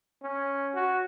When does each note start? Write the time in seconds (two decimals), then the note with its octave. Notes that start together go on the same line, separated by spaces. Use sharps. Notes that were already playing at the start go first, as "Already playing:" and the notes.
0.22 C#4
0.75 F#4